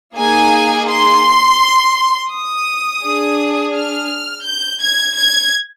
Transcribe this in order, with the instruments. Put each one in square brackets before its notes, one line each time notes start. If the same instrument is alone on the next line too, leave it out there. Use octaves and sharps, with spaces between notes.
[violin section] A#3 D#4 G#4 G#5
C6
D#6
D4 G#4
F6
G6
G#6
G#6